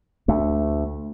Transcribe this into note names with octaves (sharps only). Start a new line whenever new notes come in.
D2 A3